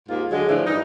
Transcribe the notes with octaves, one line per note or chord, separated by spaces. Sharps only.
D#2 G#2 A#3 F4
D3 F#3 G#3
A2 D3 E3 F3 D4
G2 E3 G3 D#4